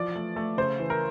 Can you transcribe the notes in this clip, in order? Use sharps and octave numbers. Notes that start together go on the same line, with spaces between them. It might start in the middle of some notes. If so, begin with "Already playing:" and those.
Already playing: E3 F3 D5
A3
A3
C#3 C5
E3
A#4